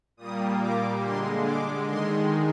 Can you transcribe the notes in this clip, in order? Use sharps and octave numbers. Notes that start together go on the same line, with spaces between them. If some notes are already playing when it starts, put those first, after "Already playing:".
A#2 G3 A#3 D#6
D6
D3 G#3 C6
D6
D#3 G#3 C6